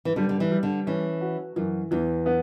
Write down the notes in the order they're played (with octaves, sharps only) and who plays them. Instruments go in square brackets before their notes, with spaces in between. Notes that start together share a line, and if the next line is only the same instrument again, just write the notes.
[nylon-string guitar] E3
[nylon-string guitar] D3 [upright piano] G3
[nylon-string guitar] D3
E3
[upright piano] G3
[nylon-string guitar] D3
[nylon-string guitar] E3 [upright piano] C#4
[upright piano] F#4
[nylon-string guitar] F#2 [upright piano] E3
[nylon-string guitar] E2 [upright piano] E3
[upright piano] B3